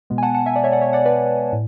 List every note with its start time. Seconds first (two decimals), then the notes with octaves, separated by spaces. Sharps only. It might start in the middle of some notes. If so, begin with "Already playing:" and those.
0.10 B2 G#3 B3
0.18 G#5
0.23 F#5 A5
0.34 F#5 A5
0.46 E5 G#5
0.56 D5 F#5
0.64 C#5 E5
0.72 D5 F#5
0.81 C#5 E5
0.93 D5 F#5
1.06 B4 D5
1.53 A2